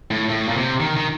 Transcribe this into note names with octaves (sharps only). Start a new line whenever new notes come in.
A2
A2
A#2
C3
D#3
D#3